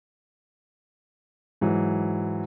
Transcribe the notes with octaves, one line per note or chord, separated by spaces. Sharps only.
G#2 E3 F#3